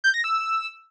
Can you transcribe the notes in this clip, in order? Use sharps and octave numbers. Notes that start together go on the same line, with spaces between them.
G6
A#6
E6